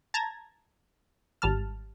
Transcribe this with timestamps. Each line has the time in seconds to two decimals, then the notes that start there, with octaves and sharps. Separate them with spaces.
0.14 A5 A#5 G#6 A#6
1.42 G#1 G3 A5 F6